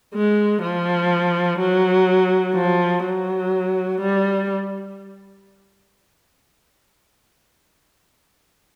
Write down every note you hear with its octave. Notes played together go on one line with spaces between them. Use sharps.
G#3
F3
F#3
F3
F#3
G3